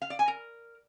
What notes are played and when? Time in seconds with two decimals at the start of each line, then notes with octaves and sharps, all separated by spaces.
0.02 F5
0.10 D5
0.19 G#5
0.28 A#4